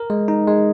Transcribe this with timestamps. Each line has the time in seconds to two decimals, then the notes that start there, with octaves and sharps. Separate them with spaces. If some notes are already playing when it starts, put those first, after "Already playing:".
Already playing: A#4
0.10 G#3
0.28 D#4
0.47 G#3